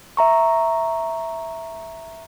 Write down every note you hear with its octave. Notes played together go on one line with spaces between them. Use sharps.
E5 A#5 C#6